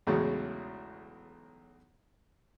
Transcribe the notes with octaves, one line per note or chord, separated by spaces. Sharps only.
B1 E2 A2 C#3 F#3 G#3